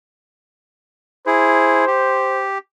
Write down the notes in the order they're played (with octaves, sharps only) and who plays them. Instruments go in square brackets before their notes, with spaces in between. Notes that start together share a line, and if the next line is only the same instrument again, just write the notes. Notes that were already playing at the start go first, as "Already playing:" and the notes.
[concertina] E4 G#4 [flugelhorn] C5
[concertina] G4